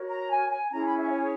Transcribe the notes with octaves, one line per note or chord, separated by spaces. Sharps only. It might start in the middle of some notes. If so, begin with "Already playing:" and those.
Already playing: F#4 A#4 C#5
A#5
G#5
G#5
C#4 E4 G#4 A#5
B5
E5
C#5